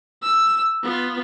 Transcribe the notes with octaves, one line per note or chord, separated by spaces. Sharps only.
E6
B3 F4